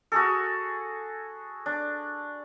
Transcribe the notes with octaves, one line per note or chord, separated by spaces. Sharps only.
F#4 G#4 A4
D4